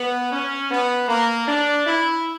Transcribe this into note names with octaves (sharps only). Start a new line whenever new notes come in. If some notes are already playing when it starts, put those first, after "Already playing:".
Already playing: B3
C#4
B3
A#3
D4
E4